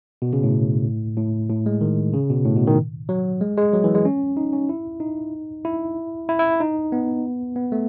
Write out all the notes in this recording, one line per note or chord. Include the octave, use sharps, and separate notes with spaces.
B2
C#3
A2
A2
A2
G#3
D#3
C#3
B2
A2
B2
D#3
F#3
G#3
G#3
F#3
E3
G#3
C#4
D#4
C#4
E4
D#4
E4
E4
E4
D#4
B3
B3
A3